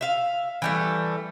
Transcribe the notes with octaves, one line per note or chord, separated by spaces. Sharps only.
E5 F5
E3 G3 A3